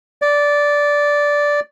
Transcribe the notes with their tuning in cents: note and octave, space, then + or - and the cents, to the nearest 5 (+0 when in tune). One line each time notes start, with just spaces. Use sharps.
D5 -10